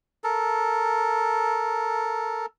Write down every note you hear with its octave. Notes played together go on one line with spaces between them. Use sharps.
A4 A#4